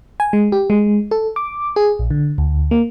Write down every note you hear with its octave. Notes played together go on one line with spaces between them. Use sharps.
G#5
G#3
G4
G#3
A4
D6
G#4
A#1
D3
D2
A#3